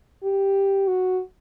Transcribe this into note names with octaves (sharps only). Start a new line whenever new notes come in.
G4
F#4